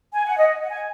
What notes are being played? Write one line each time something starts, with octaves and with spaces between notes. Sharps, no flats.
G#5
F#5
D#5
F#5
G#5